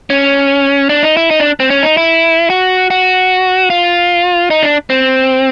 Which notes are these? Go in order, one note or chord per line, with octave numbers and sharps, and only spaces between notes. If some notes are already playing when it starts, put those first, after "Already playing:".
C#4
D4
D#4
E4
D#4
D4
C4
C#4
D#4
E4
F#4
F#4
F4
D#4
D4
C4